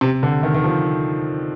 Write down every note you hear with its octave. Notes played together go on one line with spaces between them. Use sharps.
C3
D3
D#3
D#3
F3